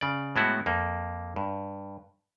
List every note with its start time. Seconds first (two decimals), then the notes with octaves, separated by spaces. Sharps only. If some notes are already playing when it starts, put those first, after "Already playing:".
0.01 C#3 D5
0.36 A2 G#3 B3 E4 F#4
0.66 F2 A#3
1.36 G2